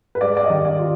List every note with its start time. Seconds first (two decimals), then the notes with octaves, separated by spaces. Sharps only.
0.15 B4
0.21 G#3 D5
0.37 D5
0.44 D#5
0.50 D#3
0.65 D5
0.79 F4